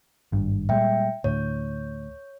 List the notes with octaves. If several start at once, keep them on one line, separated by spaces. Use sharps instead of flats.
G#1 G2
A#2 G3 G#3 E5 G5
D2 A2 C#5